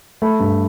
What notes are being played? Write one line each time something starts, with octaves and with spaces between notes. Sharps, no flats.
A3 B5
G2